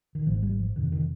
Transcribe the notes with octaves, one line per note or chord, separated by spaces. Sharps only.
D#3
G#1 G#2 F3
G3
F3
F1 F2 C3 D#3
D#3